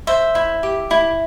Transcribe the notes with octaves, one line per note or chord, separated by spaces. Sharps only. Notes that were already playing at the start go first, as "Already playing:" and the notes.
C5 E5
E4
G4
E4